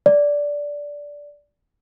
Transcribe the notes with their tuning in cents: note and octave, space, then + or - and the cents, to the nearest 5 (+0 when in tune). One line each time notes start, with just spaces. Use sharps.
D5 -10